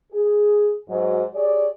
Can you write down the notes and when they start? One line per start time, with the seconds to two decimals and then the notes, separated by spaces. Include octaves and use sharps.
0.13 G#4
0.89 G#2 F#3
1.34 G4 G#4 C#5 D5